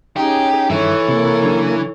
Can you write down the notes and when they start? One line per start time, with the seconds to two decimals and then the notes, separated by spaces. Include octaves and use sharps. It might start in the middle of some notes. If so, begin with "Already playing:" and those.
0.17 C#4 D#4 G4 G#4
0.70 G2 D#3 E3 A4 C#5 E5
1.08 C3 A#3
1.43 C#3 F#3 D4